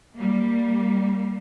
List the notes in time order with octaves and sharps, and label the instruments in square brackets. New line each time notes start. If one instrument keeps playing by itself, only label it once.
[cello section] G3 A#3